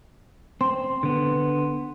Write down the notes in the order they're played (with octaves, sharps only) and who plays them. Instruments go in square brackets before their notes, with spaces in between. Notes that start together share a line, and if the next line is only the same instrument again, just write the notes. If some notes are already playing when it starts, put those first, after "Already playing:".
[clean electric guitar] C4 [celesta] C6
[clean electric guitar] D3 B3